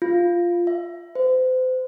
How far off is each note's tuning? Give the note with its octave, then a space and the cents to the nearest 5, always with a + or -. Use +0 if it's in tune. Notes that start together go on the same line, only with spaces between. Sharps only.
F4 -5
E5 +25
C5 -35